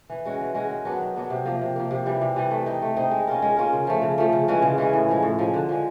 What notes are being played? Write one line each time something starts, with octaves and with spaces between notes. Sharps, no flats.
E3
G#3 C#4 F#4
E3
G#3 C#4 F#4
D#3
F#3 B3 D4
D#3
F#3 B3 D4
C3
F3 A#3
C3
F3 A#3
C3
E3 G3
C3
E3 G3
A3
C4 D#4
A3
C4 D#4
G#3
C#4 F4 A#4
G#3
C#4 F4 A#4
C#3
F3 A3
C#3
F3 A3
C#3
E3 G#3 C#4
C#3
E3 G#3 C#4
A2
F3 G#3
A2
F3 G#3
D3
F3 G#3